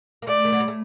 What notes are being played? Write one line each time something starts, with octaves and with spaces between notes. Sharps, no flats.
A#3
A3 D5
D#3
F#3
G3
A3